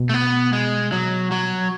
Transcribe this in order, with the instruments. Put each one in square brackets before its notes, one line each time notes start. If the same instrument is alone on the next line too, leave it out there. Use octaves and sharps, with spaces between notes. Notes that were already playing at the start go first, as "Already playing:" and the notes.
Already playing: [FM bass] B2
[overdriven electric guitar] A3
B3
G#3
F#3
F#3